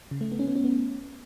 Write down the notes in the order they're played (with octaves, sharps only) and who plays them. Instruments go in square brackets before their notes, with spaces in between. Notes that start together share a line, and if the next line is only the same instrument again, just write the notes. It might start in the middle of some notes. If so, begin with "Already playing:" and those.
[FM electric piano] C#3
A3
B3
C#4
B3
C#4
B3